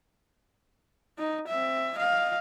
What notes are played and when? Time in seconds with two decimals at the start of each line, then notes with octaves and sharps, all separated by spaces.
1.18 D#4
1.48 C4 E5
1.95 D#5 F5